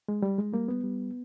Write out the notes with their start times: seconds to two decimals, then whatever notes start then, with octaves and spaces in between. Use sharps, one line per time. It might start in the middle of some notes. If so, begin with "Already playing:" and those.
0.08 G#3
0.22 G3
0.38 G#3
0.53 G3 A#3
0.68 B3
0.84 G3